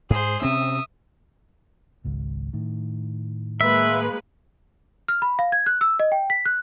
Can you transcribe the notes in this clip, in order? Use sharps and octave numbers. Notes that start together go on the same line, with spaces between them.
G#2 G#4 C5
C3 C4 C#4 E5 D#6
G#1 C#2
A2 D#3
G#3 A#3 B4 E5
F6
B5
F5
G#6
F#6
E6
D#5
G5
B6
F#6